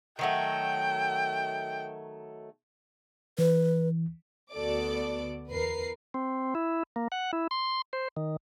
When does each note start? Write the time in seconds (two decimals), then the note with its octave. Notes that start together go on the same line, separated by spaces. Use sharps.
0.19 D#3 F#3 A3 G5
3.39 E3 B4
4.52 D2 B3 F#4 A4 D5 D6
5.49 E2 A#4 B4 C7
6.14 C4
6.55 E4
6.96 A#3
7.12 F#5
7.33 E4
7.51 C6
7.93 C5
8.17 D#3